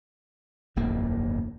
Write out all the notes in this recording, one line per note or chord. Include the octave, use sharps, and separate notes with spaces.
D1 G1 F2 A#3